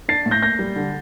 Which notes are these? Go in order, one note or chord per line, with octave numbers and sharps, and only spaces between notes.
D4 A6 C7
A2
G6 A#6
A#3 G6 A#6
G3
D3